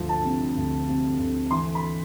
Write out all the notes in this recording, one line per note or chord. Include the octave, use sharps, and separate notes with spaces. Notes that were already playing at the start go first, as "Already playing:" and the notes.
Already playing: D2 F3
A5
C3
D2
C3
D2
E3 C6
B5